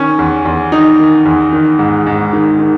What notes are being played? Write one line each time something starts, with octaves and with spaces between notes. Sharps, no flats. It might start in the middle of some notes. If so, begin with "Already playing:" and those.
Already playing: D#3 C#4
E2
E2
D#3 D#4
D#3
E2
D#3
G#2
G#2
D#3
D#3